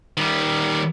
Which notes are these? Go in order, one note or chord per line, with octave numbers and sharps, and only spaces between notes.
D#3 G3